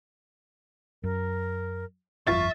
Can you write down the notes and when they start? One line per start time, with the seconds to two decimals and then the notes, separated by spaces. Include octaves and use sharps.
1.04 F#2 A#4
2.27 G1 F2 F4 E5 C#6 A6